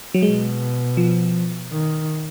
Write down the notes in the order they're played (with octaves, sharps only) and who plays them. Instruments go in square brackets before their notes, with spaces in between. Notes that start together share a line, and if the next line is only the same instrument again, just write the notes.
[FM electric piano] F#3
[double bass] B2 [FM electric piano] G#3
[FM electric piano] F3
[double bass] D#3